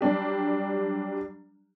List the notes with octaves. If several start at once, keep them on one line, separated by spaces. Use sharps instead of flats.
F#3 G3 D4 G4